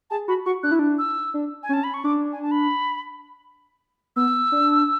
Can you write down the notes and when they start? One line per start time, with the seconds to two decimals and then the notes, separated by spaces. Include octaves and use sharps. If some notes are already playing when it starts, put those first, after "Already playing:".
0.10 G#4 A5
0.28 F#4 B5
0.46 F#4 C#6
0.63 D4 F#6
0.71 E4
0.79 D4
0.99 E6
1.34 D4
1.63 G#5
1.69 C#4 A5
1.84 B5
1.94 C#6
2.04 D4 D6
2.32 G#5
2.42 A5
2.51 B5
4.16 B3 E6
4.52 D4